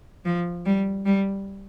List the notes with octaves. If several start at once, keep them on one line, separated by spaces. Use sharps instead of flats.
F3
G3
G3